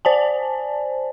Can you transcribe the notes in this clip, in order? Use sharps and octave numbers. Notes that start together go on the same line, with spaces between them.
C5 D5 G#5 A5